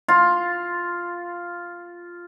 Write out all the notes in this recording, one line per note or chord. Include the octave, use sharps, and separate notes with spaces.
F4 C6